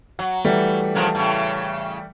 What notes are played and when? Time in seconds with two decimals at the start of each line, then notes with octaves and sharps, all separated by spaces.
0.19 F#3 F#5
0.45 E3 G3 A3
0.95 C#3 F3 A#4
1.15 A2 C#3